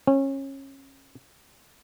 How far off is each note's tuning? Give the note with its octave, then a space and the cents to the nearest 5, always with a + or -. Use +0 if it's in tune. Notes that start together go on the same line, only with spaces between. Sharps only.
C#4 -25